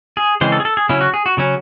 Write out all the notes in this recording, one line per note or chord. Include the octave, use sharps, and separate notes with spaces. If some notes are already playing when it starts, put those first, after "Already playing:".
G#4
C#3 E3 G#3 C4 C5
A4
G#4
A4
G#4
C#3 F#3 C#4 E4
F#4
G#4
F#4
C#3 F#3 C#4